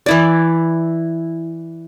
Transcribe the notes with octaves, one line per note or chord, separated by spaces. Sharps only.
E3 E4 D5